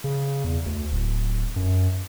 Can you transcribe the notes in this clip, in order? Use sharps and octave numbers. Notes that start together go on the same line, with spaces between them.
C#3
E2
D2
D1
F#2